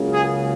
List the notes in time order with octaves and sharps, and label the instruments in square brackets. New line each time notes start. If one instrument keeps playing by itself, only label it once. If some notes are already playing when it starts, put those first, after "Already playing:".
Already playing: [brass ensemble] C#2 C#3 F#3 A#3
G#4